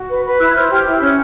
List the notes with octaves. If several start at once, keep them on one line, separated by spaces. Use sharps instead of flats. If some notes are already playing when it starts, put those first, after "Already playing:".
Already playing: F#4
B4
B4
E4 E6 F#6
G#6
C5 F6 G6
G4 F6 G6
E4
C#4 F6 G6